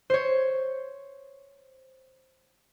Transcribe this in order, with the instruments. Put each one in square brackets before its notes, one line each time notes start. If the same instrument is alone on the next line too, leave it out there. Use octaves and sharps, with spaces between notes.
[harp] C5 C#5